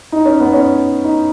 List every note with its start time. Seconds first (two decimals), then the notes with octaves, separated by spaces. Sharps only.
0.12 D#4
0.25 C#4
0.40 B3
0.53 C#4
1.04 D#4